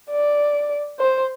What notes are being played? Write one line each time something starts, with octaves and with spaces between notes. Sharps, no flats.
D5
C5